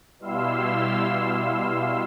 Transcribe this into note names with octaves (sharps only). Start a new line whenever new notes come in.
B2 G3 E4 F5 C6 E6